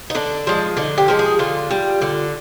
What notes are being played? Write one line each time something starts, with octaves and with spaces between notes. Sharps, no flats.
D#4
D3 D4
F3 G#3
D3 D#4
G4
F3 G#3
G#4
D3 F4
G3
D3